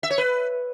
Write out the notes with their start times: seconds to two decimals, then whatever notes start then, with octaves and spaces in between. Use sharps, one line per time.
0.03 E5
0.10 C#5
0.18 B4